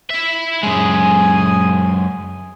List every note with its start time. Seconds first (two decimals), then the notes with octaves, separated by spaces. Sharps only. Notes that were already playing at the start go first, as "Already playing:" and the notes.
0.10 E4 E5
0.63 F#2 G#3 G#5 D#6